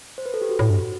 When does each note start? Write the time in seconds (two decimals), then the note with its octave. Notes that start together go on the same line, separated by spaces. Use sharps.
0.18 C5
0.26 B4
0.34 A4
0.41 G4
0.49 F#4
0.59 A2
0.70 G2